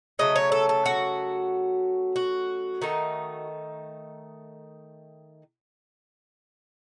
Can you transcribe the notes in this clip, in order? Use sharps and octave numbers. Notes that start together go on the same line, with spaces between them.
C#3 F#3 A3 D#5
C#5
A4
A4
F#4
F#4
D#3 A3 D#4